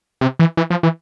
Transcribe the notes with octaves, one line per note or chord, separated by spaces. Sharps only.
C3
E3
E3
F3
E3